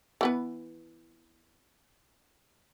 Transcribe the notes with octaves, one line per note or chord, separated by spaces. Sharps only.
E3 B3 B4